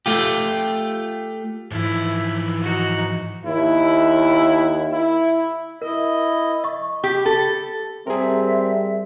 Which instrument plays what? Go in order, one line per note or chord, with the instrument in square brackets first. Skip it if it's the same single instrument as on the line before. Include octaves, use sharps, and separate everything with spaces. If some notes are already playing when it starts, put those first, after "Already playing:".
[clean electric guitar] A3 F4 G4
[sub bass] G#2 [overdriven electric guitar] E3 F3 [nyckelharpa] E4
[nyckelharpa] D#4 F#4
[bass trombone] D#2 [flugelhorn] E4
[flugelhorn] E4
[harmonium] E4 D#5 [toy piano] A#4
[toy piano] D#5 C#6
[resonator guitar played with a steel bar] G4
A4
[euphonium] G3 [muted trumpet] C4 [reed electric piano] G#4 A#4 [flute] E5